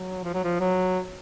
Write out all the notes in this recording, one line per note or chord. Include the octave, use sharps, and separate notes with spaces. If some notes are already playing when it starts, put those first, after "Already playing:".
Already playing: F#3
F3
F#3
F3
F#3